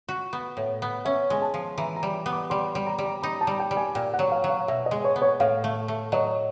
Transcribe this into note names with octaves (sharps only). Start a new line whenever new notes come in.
F#4
B3
A2
B3
C#4 E5
G#3 G#5
A5
F3
E3 A#5
A#5
G3
B3
D6
G3 C6
G3
A#5
G3
A#5
D#4 B5
A5
G3
G5
G3
G#5
A#2 G5
F#5
F#3
F5
F#3
F5
B2 E5
D#5
G#3
C#5
B3
C#5
A2 F5
A3
A3
F#3 D#5